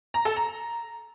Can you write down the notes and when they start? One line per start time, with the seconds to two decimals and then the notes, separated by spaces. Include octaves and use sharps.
0.14 A#5
0.25 A4
0.36 A#5